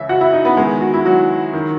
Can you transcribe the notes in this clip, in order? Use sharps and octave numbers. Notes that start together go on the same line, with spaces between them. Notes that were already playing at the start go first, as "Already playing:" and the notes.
Already playing: C#2 C#3 E3 E4 E5
F#4 F#5
E4 E5
D#4 D#5
B3 B4
E2 D#3 G#3 G#4
F#4
E4
F#3 F#4
D#3